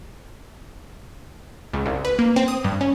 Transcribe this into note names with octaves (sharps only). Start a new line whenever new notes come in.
C#2
C2
B4
A#3
C4
D#6
G2
C#4